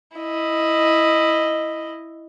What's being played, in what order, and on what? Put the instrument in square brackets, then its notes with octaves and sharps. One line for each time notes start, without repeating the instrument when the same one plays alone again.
[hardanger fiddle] E4 D#5